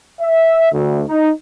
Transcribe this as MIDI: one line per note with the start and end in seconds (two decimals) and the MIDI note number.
0.21 0.69 76
0.72 1.02 38
1.08 1.30 63